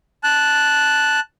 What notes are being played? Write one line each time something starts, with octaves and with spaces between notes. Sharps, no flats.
A5 F#6